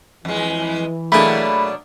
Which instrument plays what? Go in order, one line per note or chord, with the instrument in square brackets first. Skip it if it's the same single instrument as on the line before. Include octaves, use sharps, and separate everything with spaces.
[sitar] F2 G#3 [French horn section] E3
[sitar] B2 F#3 D4 [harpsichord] A3 A#3 G#4 [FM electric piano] B5